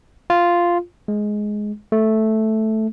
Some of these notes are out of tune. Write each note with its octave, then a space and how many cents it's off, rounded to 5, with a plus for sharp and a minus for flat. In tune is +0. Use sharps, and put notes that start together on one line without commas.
F4 -5
G#3 +10
A3 -5